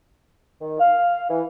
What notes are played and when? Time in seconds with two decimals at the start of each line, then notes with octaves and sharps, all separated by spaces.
0.62 D#3
0.80 F5
1.30 E3